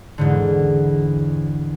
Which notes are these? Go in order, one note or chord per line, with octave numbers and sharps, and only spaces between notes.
E2 G#2 D3